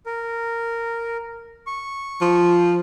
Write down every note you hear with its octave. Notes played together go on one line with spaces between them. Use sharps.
A#4
C#6
F3